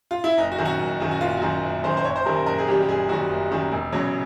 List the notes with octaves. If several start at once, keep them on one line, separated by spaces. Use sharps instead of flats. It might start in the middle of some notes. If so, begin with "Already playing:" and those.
F4
E4
F#1 D#4
F#4
F#2 D#3
F#4
F#1
F#2 D#3
F#4
F#1 F4
F#4
F#2 D#3 F4
F#1
F#2 D#3 C5
C5
F#1 C#5
C5
F#2 D#3 G3 A#4
A#4
F#1 A#4
G#4
F#2 D#3 G3 G4
G4
F#1 G#4
F#2 D#3 G3 F#4
F#1
F#2 D#3 G3
E1
E2 C#3 F#3